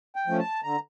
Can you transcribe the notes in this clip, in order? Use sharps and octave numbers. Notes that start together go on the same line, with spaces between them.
G5
F3 A3 C#4
A5
D3 A#5